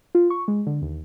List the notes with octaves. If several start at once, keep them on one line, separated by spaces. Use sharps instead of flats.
F4
C#6
G#3
D3
D#2